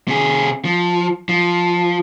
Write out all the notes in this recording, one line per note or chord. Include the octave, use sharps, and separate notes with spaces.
C3 G#4
F3
F3